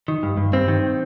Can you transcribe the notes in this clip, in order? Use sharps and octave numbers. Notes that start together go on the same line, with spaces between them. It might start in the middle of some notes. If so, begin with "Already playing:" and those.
D#3
G2
G2
G2 C4
D#3